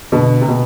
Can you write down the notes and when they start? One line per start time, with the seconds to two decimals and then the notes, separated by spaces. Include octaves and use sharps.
0.12 B2 D3
0.41 C3
0.48 B2